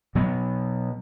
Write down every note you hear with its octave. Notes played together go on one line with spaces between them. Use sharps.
B2 F#3 B3